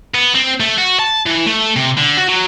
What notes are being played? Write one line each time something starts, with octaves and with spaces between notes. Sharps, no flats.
B3
C4
A3
F#4
A5
E3
A3
C3
D3
F#4
F#3